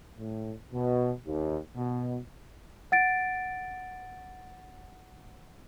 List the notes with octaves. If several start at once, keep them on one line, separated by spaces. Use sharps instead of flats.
A2
B2
D#2
B2
F#5 A6 D7